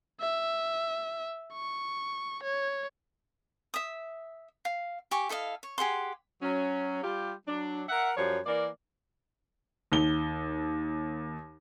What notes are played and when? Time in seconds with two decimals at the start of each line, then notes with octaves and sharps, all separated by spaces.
0.20 E5
1.53 C#6
2.43 C#5
3.74 E5 D#6
4.65 F5
5.11 G4 G#5 C#6 D6
5.29 E4 A4 D#5 F5
5.63 C#5
5.78 G4 G#4 F#5 C6
6.42 F#3 C#4
7.03 G3 F4 G4
7.48 F#3 D4
7.89 A#4 E5 F#5
8.17 F#2 F3 G3 C#5
8.46 E3 A#3 A#4 D5
9.92 D#2 G7